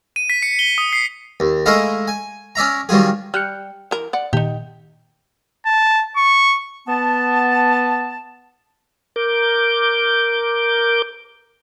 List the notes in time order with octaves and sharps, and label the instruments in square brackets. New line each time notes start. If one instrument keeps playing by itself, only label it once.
[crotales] D#7
B6
C#7
G7
D#6
C7
[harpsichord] D#2
G#3 A3 D#4 E4 D#5 F5
G#5
C#4 D5 E5 A#5
D#3 F#3 G3 F4 G#4
[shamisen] G3 [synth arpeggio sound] F6 F#6 C#7
[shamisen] E3 A#4
D5 F#5
[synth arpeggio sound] A#2 D#3 [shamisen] D#4 G4
[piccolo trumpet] A5
C#6
[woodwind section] B3 A5
[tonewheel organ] A#4 D6 G6